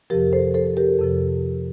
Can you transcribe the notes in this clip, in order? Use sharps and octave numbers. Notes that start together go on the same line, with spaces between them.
F2 C3 F3 G4 A#4
A4 C5
A4 C5
G4 A#4
F2 C3 F3